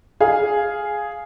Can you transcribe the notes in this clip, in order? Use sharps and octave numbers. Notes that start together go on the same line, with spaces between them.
G#4 F5